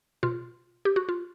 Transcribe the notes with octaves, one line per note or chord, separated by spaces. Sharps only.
B2 F4
G4
F#4
F4